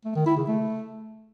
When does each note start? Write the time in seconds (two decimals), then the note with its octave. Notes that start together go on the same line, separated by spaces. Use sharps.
0.05 A3
0.16 D#3
0.26 E4
0.37 C#3
0.48 A3